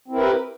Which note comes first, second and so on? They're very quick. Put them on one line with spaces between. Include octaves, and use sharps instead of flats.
C4 E4 A#4 B4 G4